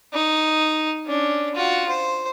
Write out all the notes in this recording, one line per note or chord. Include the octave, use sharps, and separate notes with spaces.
D#4
C#4 D4
F4 F#4
C5